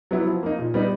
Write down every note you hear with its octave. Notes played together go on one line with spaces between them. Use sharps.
F#3 B3 E4
F3
A#3 D#4
A#2
G3 B3 D#4